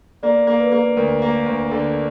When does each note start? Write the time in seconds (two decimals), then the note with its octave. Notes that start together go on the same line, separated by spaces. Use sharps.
0.23 A#3 D5
0.47 A#3
0.60 B4
0.72 A#3
0.97 D2 A#4
1.22 A#3
1.46 D2
1.71 D3